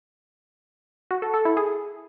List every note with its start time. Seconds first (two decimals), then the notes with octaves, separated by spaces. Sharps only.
1.11 F#4
1.22 A4
1.34 A4
1.45 E4
1.57 G#4